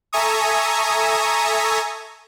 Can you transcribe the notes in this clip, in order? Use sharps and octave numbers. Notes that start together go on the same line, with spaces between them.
A4 E5 G#5 A#5 C#6 D#6